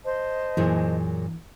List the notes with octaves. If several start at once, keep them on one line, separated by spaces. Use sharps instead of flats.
C5 D#5 A5
F#2 A#2 E3 G#4